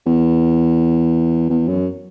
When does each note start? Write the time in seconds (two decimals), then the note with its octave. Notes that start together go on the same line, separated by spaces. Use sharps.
0.06 E2
1.50 E2
1.68 F#2